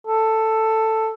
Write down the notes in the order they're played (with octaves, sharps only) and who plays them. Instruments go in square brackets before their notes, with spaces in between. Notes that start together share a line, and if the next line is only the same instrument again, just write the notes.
[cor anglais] A4